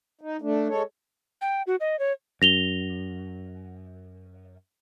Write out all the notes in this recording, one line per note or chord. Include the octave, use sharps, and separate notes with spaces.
D#4
A3 D4
G#3 A4 C#5
G5
F#4
D#5
C#5
F#2 A#6 F7 G7